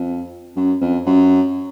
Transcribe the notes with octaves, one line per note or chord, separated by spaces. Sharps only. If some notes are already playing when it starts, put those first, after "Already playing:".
Already playing: F2
F#2
F2
F#2